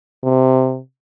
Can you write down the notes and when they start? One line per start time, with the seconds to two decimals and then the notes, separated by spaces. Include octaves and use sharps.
0.24 C3